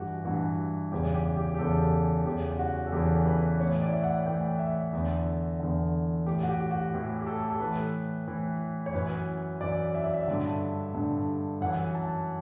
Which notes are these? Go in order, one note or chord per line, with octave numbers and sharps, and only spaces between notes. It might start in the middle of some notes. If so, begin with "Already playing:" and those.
Already playing: G2 E3 F#4 G4
G2 E3 F#4
E2 C#3 E3 G4
G4
G4
G4
E2 C#3 E3 A4
E2 C#3 E3 G4
F#4
A4
E2 C#3 E3 G4
B4
A2 E3 C#5
D5
E5
F#5
A2 E3 G5
E5
E2 D3
E2 D3
A2 E3 G4
F#4
G4
F#4
A2 E3 G4
G4
A4
A4
A2 E3 B4
A2 E3
C#5
F#2 E3 B4
F#2 E3 D5
E5
D5
E5
G2 D3
G2 D3
F#2 E3 F#5
A5